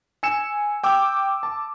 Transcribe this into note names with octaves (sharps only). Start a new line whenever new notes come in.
G#5 E6 C#7 E7
G5 D6 E6
A5